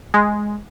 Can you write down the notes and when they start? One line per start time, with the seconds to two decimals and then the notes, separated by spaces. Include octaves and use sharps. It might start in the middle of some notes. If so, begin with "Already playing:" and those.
0.14 G#3